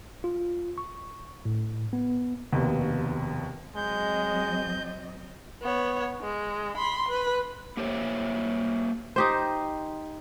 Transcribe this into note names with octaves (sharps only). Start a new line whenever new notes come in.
F4
C#6
A2
B3
F1 D#2 B2
F#3 G#3 C4 D#5 G6
B3 C#5
G#3
B5 C6
B4
A#3 G4 C5 C#5 E5
D#4 G4 C5